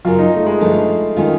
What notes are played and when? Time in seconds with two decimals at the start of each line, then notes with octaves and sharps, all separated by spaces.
0.05 F#2 C#3 F#3 F4
0.19 D#4
0.35 A3
0.46 G#3
0.60 G2 D3 F3 A3
1.16 D#3 G#3 C#4 F4